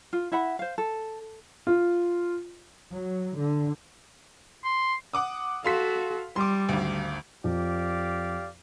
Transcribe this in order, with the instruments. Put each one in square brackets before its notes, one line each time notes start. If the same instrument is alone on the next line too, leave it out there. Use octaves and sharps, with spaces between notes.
[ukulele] F4
E4 E5 F#5 B5
C5 F5
A4
[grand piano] F4
[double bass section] F#3
D3
[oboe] C6
[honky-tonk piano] F#5 D6 D#6
[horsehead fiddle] F#4 A4 [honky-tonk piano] F5 C6 B6
[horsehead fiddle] G3 [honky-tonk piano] C6 D6
[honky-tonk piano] G#1 D2
[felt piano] F2 [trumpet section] G4 D5 F5